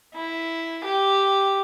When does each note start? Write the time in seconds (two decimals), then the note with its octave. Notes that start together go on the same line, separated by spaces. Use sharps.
0.14 E4
0.84 G4